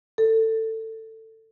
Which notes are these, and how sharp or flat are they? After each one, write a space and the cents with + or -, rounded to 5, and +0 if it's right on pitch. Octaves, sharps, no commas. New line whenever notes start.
A4 +20